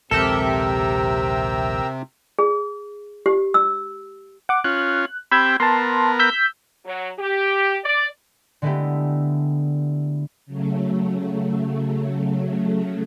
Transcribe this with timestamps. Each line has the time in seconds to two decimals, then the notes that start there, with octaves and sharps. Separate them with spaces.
0.11 A#1 D#2 C3 G#3 G4 A4 A#4 E5
2.39 G#4
3.26 G4
3.54 E6
4.49 F#5 D6
4.64 C#4 F4 F#6
5.32 C4 G4 G5 B5 E6 G#6
5.60 B3 A#4 A5 C6
6.19 E6 G6 B6
6.85 F#3
7.18 G4
7.84 D5
8.62 D3 G#3 A3 B3 E4 G4
10.46 C#3 F#3 A3